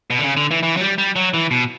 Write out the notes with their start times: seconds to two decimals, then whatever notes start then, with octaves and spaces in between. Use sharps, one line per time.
0.10 B2
0.19 D3
0.24 C#3
0.37 D3
0.51 E3
0.63 E3
0.77 F#3
0.81 G3
0.98 G3
1.16 F#3
1.34 E3
1.51 B2